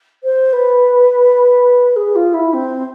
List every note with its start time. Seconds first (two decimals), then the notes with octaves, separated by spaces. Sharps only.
0.23 C5
0.52 B4
1.96 G#4
2.15 F4
2.33 E4
2.53 C4